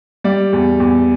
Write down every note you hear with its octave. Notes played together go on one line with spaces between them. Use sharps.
G3 D5
E2
E2